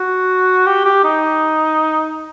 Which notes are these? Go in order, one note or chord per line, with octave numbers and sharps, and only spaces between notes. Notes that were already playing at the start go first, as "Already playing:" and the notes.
Already playing: F#4
G4
G4
D#4